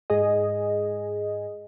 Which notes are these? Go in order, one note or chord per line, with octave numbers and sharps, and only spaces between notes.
G#2 G#4 D#5